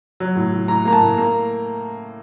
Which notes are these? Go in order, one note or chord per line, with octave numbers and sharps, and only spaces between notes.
F#3
A2
A2
A2 A#5
A#3 A#5
A5
A2
A#3 A#5